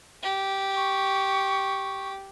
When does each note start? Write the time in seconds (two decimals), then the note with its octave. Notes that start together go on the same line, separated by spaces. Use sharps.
0.23 G4
0.76 C#6